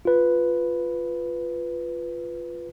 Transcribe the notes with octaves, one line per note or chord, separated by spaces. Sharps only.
F4 B4